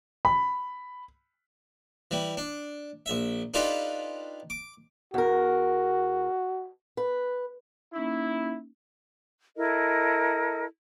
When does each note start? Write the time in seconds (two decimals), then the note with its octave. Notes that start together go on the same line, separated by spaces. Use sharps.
0.25 B5
2.11 E3 G3
2.37 D4
3.06 A#1 E5
3.54 D4 D#4 F4 G4 A4 B4
4.50 D6
5.14 E2 F#4 A#4
6.97 B4
7.94 A#3 C#4 D#4 E4
9.57 E4 A4 A#4 D#5